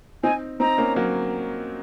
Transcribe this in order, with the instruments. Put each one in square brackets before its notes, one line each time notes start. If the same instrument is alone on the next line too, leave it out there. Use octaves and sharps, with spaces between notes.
[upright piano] C4 D#4 [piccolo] G#5
[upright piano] C4 D#4 [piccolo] A#5
[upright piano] A#3 C#4
F#3 A#3